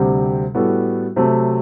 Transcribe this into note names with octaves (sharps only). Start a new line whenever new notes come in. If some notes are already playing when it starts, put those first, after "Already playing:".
Already playing: D2 C3 G3 C4 G4
A2 G3 B3 F#4 A4
C3 F#3 A3 C4